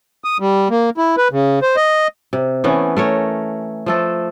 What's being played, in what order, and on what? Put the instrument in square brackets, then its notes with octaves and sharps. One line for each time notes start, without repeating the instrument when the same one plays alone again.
[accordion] D#6
G3
A#3
E4
B4
C#3
C5
D#5
[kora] C3
E3 A3 B3 C#4
A3 A#4 C#5
F3 A3 A4